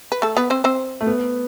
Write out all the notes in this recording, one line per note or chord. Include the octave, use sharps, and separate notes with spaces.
B4
A3 A4
B3 B4
C4 C5
C4 C5
A3
B3